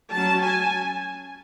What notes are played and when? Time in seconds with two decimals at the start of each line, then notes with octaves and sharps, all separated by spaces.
0.14 F#3 C#4 A5
0.43 G#5